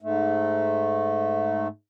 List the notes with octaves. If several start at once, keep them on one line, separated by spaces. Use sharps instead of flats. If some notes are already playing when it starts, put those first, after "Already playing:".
G#2 A3